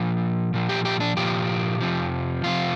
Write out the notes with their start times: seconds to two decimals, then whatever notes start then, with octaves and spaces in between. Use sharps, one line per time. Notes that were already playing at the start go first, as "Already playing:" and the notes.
Already playing: A#2 F3
0.54 A#2 F3
0.69 G4
0.85 G4
1.00 D4
1.17 A#2 F3 G4
1.81 F2 C3 F3
2.44 F2 C3 F3 F4